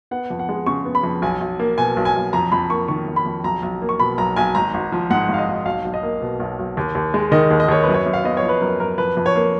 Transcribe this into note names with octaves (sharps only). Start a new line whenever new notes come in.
B3 F#5
F2
F#5
G#3
C#3 C#6
B3
B5
F2
B1 G#5
B1
A#3
B2 G#5
B1
G#5
B1
F2 A#5
F2 B5
A#3 C#6
D#3 C#6
F2
B5
F2
B1 A#5
B1
A#3
C#6
B2 B5
B1 A#5
B1 G#5
G#1 A#5
G#1
F3
G#2 F#5
G#1 F5
D#5
G#1
B1 F5
B1
D#5
A#3
B2
B1
B1
D#2
D#2
G#3
D#3 D#5
D#2
D#5
D#2 C#5
F#2 B4
C#5
F#2
F5
B3 D#5
C#5
F3
B4
F#2 A#4
F#2 A#4
F2 B4
F2
C#5
A#3